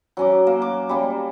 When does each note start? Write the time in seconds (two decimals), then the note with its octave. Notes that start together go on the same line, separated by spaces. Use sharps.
0.17 F#3 C#4 D6
0.47 A#3
0.62 D6
0.89 G3 A#3 C#4